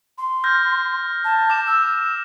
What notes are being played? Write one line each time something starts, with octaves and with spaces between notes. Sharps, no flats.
C6
F6 G6 A#6
A5
D6 E7
E6